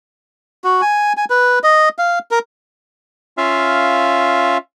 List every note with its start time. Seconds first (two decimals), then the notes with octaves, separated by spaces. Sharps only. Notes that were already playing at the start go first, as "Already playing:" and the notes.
0.64 F#4
0.82 G#5
1.17 G#5
1.30 B4
1.64 D#5
1.98 F5
2.31 A#4
3.38 C#4 F4 E5 F5